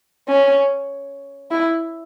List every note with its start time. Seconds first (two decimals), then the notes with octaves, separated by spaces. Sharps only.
0.28 C#4
1.51 E4